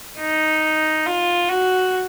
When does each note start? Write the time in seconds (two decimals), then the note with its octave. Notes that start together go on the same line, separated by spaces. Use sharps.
0.19 D#4
1.06 F4
1.49 F#4